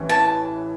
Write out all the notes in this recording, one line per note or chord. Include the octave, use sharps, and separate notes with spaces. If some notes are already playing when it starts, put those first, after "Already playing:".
Already playing: A1 A2 E3 C#4
A5